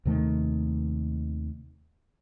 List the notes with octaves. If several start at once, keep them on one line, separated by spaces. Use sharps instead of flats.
D#2 C3 D#3 A3